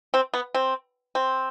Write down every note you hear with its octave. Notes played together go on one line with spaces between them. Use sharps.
C4
B3
C4
C4